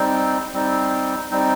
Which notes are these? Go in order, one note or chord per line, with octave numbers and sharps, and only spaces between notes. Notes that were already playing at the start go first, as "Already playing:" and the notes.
Already playing: G3 C4 D#4
G3 C4 D#4
G3 C4 D#4